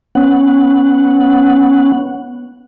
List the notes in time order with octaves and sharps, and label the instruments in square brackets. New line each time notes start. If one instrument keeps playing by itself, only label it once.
[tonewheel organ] B3 C#4 F#5